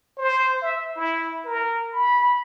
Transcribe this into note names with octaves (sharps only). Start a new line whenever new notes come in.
C5
E5
E4
A#4
B5